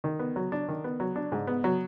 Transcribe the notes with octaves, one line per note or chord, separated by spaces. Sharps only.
D#3
B3
F#3
D4
D#3
B3
F#3
D4
G#2
B3
F#3